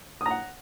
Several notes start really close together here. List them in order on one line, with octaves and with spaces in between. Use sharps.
D#6 A#5 F#5